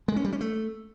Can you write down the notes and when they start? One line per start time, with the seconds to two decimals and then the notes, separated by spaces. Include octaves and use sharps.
0.08 G#3
0.16 C#4
0.24 G3
0.33 C#4
0.41 A3